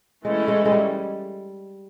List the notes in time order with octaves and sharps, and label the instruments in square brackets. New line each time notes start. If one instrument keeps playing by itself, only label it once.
[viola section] E3 A3 C#4 E4 A4 [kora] G#3
[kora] G#3
G#3
G3